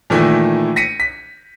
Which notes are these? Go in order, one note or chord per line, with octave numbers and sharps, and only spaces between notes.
A#2 D#3 E3 A3 E4
A#6 B6 C#7 D#7
B6